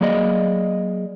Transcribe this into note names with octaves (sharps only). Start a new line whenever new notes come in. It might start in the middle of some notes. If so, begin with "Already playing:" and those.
F#3 A#3 G#4 D5 D#5